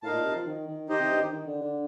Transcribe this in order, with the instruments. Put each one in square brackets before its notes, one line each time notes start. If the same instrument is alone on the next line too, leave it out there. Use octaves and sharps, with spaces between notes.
[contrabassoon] A2 [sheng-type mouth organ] D#4 A#4 F5 A5
[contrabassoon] A#2
C3
F3
D#3
D#3
[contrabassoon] D#3 [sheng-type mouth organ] D#4 G4 C5 D#5
[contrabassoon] C3
G2
D#3
D#3
D3
D3